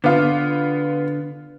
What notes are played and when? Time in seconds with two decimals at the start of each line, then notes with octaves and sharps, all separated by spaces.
0.04 D3 B3 F4